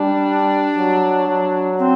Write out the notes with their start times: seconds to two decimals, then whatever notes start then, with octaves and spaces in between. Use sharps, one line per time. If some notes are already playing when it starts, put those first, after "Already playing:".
Already playing: G3 D4
0.77 F#3
1.27 F#3
1.78 C4